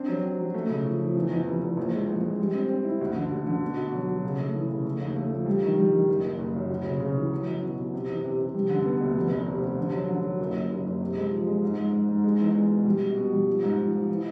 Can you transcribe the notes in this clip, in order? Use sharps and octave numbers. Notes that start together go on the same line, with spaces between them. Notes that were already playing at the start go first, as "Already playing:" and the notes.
Already playing: C4 D4
F#3
C4
F#3
A3
C#3
F3
F3
E2
E2
F1
E2
A#1
G#3
A#1
G#3
G3
C4
C4
E4
D2
D3
D2
D3
B2
B2
F#3
F#3
C#3
A3
E3
C#3
A3
D#2
A3
F3
G3
D#3
G3
D#3
F#1
F#1
F#1
F#2
D2
C#3
C#3
E3
F#3
F#3
B2
B2
C3
E2
C3
C3
G3
D3
B3
D2
F1
F1
C3
C3
D3
F#3
D3
F#3
F#1
F#1
F#1
F#1
C3
G#3
F3
G#3
G#2
G#2
G#2
G#2
G#3
E2
G#3
B2
G3
B2
B2
G3
F3
G#2
F3
F3
E3